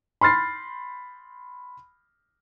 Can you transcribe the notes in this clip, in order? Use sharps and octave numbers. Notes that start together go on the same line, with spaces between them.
B5 C6 F6 A6 C7